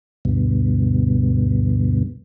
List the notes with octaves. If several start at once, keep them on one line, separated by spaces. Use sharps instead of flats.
D2 G2 B2